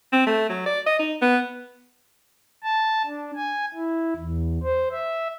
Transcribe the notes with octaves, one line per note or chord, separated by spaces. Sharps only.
C4
A3
F#3
D5
D#5
D#4
B3
A5
D4
G#5
E4
E2
C5
E5